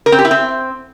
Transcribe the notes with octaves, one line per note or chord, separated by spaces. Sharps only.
A#4
C4
G4
E4
C4